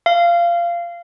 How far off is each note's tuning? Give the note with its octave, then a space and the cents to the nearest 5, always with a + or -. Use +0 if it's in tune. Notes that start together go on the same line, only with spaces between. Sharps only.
F5 -20